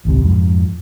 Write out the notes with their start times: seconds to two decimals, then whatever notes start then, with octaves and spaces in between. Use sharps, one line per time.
0.05 G#1 C#2 C3
0.22 F2 G#2 F3